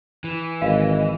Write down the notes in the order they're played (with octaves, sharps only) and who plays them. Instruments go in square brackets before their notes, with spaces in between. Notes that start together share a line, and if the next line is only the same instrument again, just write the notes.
[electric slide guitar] E3
[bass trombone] G#1 [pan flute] D#5 [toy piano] F5